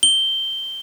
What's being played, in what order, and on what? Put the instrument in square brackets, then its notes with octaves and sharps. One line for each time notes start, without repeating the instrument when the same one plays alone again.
[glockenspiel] G7